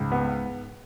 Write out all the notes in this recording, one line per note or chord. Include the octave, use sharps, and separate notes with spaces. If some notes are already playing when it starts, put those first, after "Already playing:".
Already playing: C#2 G#2
B3